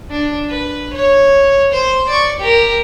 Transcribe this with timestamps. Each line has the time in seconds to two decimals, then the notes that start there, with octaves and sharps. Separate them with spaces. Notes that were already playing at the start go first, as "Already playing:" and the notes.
0.10 D4
0.49 B4
0.93 C#5
1.72 C5
2.09 D5 C#6
2.40 G4 A#4